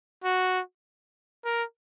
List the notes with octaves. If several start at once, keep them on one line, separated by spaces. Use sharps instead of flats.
F#4
A#4